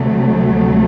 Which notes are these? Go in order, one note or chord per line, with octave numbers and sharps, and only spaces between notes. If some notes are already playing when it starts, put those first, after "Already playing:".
Already playing: D2 C3 F#3 A3